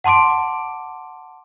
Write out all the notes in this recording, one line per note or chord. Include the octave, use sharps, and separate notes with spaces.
F#5 A5 C6 D6 D7